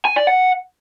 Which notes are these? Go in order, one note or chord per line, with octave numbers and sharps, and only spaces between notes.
G#5
D5
F#5